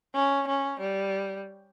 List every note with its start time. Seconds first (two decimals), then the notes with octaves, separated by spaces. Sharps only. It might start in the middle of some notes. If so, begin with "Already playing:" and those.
0.14 C#4
0.48 C#4
0.80 G3